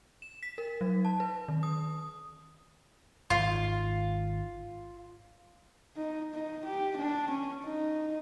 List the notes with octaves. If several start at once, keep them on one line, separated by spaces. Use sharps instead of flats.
E7
B6
A#4
F#3
A5
B4
D#3
D#6
D#1 G#1 F4
D#4
D#4
G4
D4
C#4
D#4